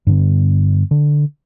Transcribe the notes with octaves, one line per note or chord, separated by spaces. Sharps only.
G2 D3 B3
D3